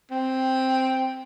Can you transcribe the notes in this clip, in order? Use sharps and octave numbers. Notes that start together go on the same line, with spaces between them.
C4